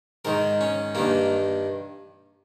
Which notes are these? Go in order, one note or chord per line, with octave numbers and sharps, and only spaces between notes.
G#2 D#3 A#4
C#4
G2 D#3 A#3